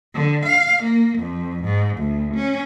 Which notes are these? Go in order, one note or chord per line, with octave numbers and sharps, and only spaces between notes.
D3
F5
A#3
F2
G#2
D2
C#4